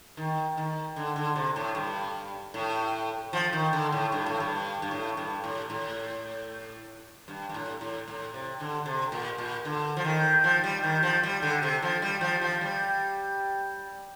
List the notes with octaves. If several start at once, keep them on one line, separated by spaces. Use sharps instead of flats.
D#3
D#3
D3
D3
C3
A2
G2
A2
F3
D#3
D3
A2
G2
A2
G2
G2
A2
G2
A2
A2
G2
G2
A2
A2
A2
C3
D3
C3
A#2
A#2
D3
F3
D#3
F3
G3
D#3
F3
G3
D3
C3
F3
G3
F3
F3
G3